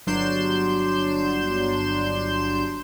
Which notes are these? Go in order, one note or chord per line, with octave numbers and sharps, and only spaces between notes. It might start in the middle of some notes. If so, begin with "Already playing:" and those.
G1 F#3 D4 C6 G6 E7